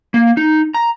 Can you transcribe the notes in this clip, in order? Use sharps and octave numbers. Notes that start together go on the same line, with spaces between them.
A#3
D#4
A#5